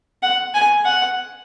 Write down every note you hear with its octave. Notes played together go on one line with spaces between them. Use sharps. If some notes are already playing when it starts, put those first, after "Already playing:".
F#5
G#5
F#5